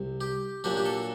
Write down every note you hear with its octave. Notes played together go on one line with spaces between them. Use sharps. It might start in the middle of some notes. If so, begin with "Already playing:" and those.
Already playing: C2 C3
G4
A#2 F#3 A#3 D4 G4
G4
A4